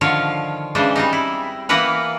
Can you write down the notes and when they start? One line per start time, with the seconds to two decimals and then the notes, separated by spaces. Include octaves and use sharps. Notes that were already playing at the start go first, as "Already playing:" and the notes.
0.01 D3 D#3 F3 C#5 F5
0.75 C#3 E3 G#3 D4 C5
0.96 G3 C4 D#4
1.13 E4
1.69 E3 A#3 B3 A#4 B4 F#5